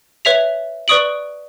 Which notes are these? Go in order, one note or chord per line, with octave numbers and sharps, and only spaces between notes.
B4 C#5 E5 B6 F7
B4 D5 C#6 D#6 D7 F#7